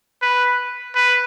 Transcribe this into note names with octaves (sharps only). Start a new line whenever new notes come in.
B4
B4